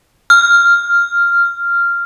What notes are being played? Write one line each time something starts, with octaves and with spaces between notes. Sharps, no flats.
F6